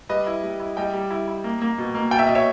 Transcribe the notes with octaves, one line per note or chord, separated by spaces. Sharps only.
G3 B4 D#5
E4
G3
E4
G3 D#5 G5
G3
E4
E4
A#3
A#3
B2
A#3
B2 G5
E5
B2 D#5
C#5 E5